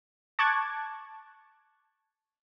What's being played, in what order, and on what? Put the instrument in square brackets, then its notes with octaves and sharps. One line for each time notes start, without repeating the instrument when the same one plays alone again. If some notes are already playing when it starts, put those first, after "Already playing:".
[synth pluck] A5 C#6 D6 F#6 G#6 A6